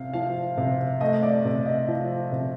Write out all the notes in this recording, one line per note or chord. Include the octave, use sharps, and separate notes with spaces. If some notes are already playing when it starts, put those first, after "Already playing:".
Already playing: C3 F5
F3 F5
C3
A3 D#5
D5
C3
D#5
F3
C3